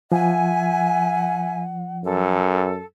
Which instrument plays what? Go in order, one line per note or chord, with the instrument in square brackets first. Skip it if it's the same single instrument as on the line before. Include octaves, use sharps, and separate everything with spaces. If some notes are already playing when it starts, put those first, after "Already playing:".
[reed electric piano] F3 [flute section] E5 G#5 [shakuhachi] F#5
[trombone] F#2 [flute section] A4